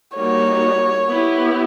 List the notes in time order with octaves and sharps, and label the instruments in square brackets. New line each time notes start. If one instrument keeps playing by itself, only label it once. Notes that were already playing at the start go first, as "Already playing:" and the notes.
[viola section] G3 A#3 D#4 F#4 [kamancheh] C#5
[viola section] B3 E4 G4